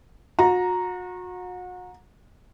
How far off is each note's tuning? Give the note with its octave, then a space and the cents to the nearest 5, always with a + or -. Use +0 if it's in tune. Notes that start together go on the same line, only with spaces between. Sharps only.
F#4 -35 A#5 +0